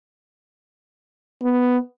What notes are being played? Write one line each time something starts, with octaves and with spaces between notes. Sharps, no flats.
B3